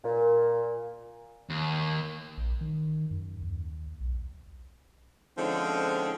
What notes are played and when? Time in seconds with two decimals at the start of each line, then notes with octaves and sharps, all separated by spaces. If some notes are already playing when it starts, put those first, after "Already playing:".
0.04 A#2
1.50 D#2
2.38 A#1
2.61 D#3
3.11 F#2
3.42 D#2
4.01 B1
5.37 D3 F3 G#3 C4 C#4 D#4